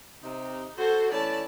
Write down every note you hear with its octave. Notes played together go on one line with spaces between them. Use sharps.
C3 D#4
F#4 A4 C5
E3 A3 C#4 D5 A5